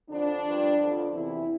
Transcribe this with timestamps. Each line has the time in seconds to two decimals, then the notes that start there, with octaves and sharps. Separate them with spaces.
0.10 F2 D3 F3 D4
0.45 G2 F3
0.79 F2 D3 F3
1.13 E2 C3 E3 E4